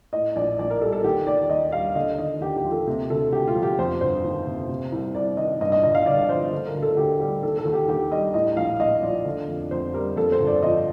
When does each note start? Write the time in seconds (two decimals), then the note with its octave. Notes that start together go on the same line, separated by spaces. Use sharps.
0.13 A2 D#5
0.36 A#1 D5
0.59 A#1 D5
0.70 A#4
0.81 G3 A4
0.93 A4
1.04 D#3 G4
1.27 D#2 D5
1.50 D#2 D#5
1.72 G3 F5
1.95 D3 D#5
2.18 D#2 D#5
2.41 D#2 G4
2.56 G4
2.64 F3
2.71 A4
2.87 C3
3.10 D2 A4
3.33 D2 G4
3.47 F4
3.55 F3
3.63 G4
3.78 F2 C5
4.01 G1 C5
4.24 D#3
4.46 C3
4.69 C3
4.92 C2
5.15 C2 D5
5.37 D#3 D#5
5.61 G2 D#5
5.72 D#5
5.83 G1 D#5
5.95 F5
6.06 G1 D5
6.29 F3 C5
6.52 D3
6.67 A#4
6.75 D2
6.82 A4
6.97 D2 G4
7.20 G3 G4
7.43 D#3 A4
7.58 A4
7.65 D#2
7.73 G4
7.88 D#2 G4
8.11 G3 D#5
8.34 A2 D#5
8.56 A#1 F5
8.80 A#1 D#5
9.02 F3 D5
9.25 D3
9.48 F2
9.71 F2 C5
9.94 G3 A#4
10.16 F2 A4
10.32 C5
10.39 G1
10.47 D5
10.62 F3 D#5